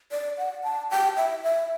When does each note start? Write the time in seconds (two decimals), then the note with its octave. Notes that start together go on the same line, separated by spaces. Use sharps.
0.11 D5
0.38 F#5
0.64 A5
0.91 G5
1.17 E5
1.44 E5